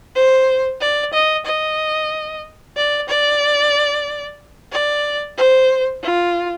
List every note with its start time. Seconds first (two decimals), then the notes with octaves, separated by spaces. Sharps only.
0.15 C5
0.81 D5
1.14 D#5
1.46 D#5
2.77 D5
3.09 D5
4.72 D5
5.37 C5
6.03 F4